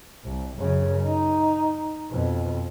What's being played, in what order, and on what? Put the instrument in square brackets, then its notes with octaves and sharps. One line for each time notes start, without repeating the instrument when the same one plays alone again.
[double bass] C2
F#2 C#3
D#4
F2 B2